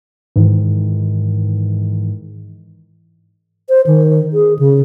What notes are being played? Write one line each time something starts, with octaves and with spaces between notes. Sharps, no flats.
G#2 D#3 E3
C5
D#3
G#4
C#3